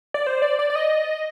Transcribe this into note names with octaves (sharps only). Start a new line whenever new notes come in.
D5
C5
D5
D5
D5
D#5